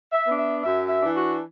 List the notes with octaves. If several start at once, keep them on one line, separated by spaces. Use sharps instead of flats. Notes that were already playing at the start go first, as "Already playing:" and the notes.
E5
B3 D4
E5
F#2 E5
E5
E3 D4
F#4